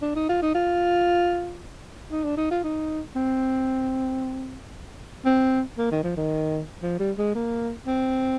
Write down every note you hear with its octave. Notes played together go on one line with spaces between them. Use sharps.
D4
D#4
F4
D#4
F4
D#4
D4
D#4
F4
D#4
C4
C4
A#3
D#3
F3
D#3
F3
G3
G#3
A#3
C4